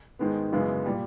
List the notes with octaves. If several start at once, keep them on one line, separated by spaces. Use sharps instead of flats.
G#2 D#3 G#3 B3
F#2 C#3 E3 G#3 B3
A#2 G3